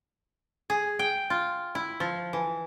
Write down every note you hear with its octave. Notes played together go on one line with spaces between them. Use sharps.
G#4
G5
F4
E4
F3
E3